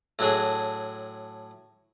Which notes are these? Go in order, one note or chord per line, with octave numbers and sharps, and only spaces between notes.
A2 F#3 D4 G#4